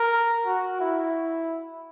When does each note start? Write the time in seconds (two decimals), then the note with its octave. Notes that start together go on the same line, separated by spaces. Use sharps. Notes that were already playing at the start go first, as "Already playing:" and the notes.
Already playing: A#4
0.46 F#4
0.80 E4